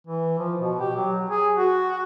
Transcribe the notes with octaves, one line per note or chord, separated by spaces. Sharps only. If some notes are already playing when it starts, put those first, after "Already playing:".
E3
F3
B2
G4
F#3
G#4
F#4